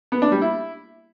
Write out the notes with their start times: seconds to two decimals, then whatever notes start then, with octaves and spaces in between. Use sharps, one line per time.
0.12 B3
0.22 D4
0.32 G3
0.42 E4